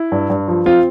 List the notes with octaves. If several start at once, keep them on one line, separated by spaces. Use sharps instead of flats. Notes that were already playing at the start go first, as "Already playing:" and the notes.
Already playing: E4
G2
G2
F3
C4 F4